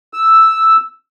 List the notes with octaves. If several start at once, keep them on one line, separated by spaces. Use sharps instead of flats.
E6